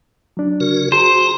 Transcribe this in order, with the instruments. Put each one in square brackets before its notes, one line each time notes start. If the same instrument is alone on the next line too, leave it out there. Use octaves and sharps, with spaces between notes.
[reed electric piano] F#3 D4
[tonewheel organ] C#3 F#4 A#4
[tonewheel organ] F#4 A#5 [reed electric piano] G#4 [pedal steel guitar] C5